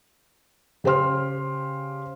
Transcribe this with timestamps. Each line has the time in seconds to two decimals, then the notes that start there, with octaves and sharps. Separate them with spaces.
0.84 C#3 G4 C5 C6 F6